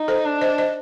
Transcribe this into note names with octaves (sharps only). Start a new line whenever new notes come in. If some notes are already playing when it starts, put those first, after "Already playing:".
Already playing: D#4
A4 C5
D4
C5 D#5
C5 D#5